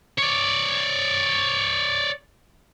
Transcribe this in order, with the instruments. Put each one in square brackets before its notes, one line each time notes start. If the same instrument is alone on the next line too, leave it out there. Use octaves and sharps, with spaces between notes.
[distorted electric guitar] C#5 D5